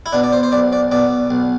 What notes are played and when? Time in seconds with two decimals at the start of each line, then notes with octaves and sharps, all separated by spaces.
0.06 E4
0.13 B2 D4
0.23 D5
0.33 C5
0.43 C5
0.52 B1 D5
0.73 D5
0.91 B2 D5
1.30 B1